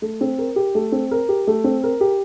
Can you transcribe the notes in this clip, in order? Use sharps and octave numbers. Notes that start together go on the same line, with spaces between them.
A3
C4
A#4
G4
A3
C4
A#4
G4
A3
C4
A#4
G4